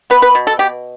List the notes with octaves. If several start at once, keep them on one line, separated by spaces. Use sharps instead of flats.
B3 B4
B4
B2
A4
B2 G4